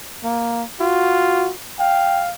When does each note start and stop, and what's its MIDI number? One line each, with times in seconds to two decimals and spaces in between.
0.24 0.63 58
0.80 1.51 65
0.80 1.51 66
1.79 2.33 77
1.79 2.24 79